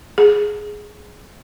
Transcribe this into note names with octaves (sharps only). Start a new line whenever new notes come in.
G#4